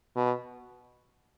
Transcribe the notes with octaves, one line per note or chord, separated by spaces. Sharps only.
B2